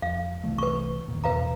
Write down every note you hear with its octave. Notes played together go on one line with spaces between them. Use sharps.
F2 F5
C2 E3 A3
B4 C#6
F#1 D#2 A#2
F1 E2 B2 B4 F5 A#5